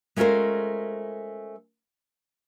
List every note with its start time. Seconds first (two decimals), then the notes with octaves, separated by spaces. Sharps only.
0.16 G#3 A3 C#4 F4 A#4 C5